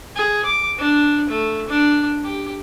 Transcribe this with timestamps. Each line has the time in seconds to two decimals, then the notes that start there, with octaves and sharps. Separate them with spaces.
0.15 G#4
0.45 D6
0.78 D4
1.29 A3
1.68 D4
2.24 G4